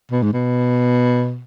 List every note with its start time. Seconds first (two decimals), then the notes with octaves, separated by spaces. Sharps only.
0.11 B2
0.23 G#2
0.33 B2